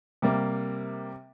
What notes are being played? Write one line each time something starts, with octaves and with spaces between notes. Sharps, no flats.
C3 G3 A#3